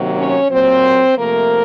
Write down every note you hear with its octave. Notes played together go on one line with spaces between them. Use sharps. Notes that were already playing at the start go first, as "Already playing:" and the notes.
Already playing: C3 D#3 F#3 A#3
C#4 C#5
A#2 F#3 A#3 C4 C5
C3 F3 A3 A#3 A#4